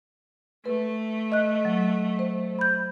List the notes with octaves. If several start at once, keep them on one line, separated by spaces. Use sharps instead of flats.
A3 B4
D#5 F#6
F#3
C5
B5 G6